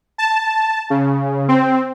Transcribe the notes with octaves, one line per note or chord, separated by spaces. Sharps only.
A5
C#3
C4